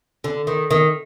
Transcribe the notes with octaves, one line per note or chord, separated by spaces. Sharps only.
D3
D#3
D#3